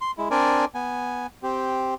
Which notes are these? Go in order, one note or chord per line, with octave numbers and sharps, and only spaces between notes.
C6
G#3 E4
C4 D4 A#4 D5 G#5
B3 G#5
C4 G4